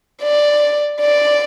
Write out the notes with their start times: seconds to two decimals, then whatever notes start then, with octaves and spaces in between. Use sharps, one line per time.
0.22 D5
1.01 D5